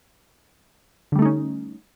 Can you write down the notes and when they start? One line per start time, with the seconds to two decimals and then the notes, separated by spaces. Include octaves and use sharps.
1.12 D3
1.15 G3
1.19 A3
1.22 D#4
1.25 C#4